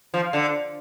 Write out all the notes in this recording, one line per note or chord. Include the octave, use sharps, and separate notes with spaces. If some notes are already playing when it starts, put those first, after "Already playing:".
F3
D3